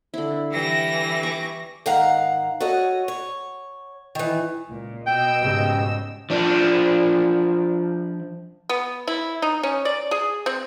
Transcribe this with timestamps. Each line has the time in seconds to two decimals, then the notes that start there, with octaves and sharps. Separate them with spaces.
0.14 D3 E4
0.51 E3 G3 A#6
1.23 C#6 D6
1.86 G#2 D#3 F5 F#5 A#5
2.60 F#4 A4 C#5 D#5
3.08 C#5
4.15 D#3 E3
4.70 C#2 A#2
5.07 B2 D#5 G5 E6
5.41 G#2 C#3 G3
6.30 F3 D4
8.69 B3
9.08 E4
9.42 D#4
9.63 C#4
9.85 D5
10.11 G#4
10.46 C4